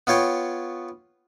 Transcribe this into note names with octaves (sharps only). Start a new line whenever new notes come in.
B3 F4 C#5 G5